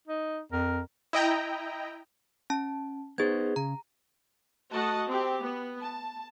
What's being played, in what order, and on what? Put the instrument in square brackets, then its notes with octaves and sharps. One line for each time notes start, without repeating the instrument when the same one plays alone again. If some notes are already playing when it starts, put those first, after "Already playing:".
[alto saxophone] D#4
[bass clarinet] F2 [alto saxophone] A#4
[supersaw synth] E4 D#5 G5 A#5
[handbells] C#4 A5
[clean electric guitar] B3 D#4 C5 [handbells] G#4 G#6
[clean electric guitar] C#3 [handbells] A#5
[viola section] A3 F#4 D#5 F#5 A5
C4 G4
B3
A5